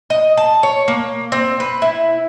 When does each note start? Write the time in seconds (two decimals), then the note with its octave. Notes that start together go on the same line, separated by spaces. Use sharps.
0.10 D#5
0.37 A5
0.63 C#5
0.88 A#3
1.32 C4
1.60 B4
1.82 E4